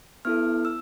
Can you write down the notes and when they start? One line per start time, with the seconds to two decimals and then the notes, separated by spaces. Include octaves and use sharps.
0.25 B3 E4 A4 F6
0.65 E6